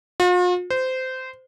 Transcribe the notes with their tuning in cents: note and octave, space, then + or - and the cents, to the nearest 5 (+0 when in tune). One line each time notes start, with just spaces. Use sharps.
F4 +45
C5 -20